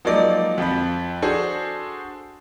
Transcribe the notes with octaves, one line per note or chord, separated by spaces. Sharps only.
F3 F#3 G#3 A#3 D#4 D5
F2 F3 B5
D4 F#4 G#4 A4 C5